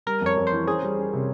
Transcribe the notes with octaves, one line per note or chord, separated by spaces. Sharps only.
G3 A#4
F2 C#5
F2
C5
E3
C#4 G#4
G3
C#4
C3